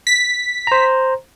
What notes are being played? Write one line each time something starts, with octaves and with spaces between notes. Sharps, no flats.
B6
C5 A#5